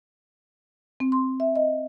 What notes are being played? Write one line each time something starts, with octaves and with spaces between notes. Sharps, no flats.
C4
C6
E5
D#5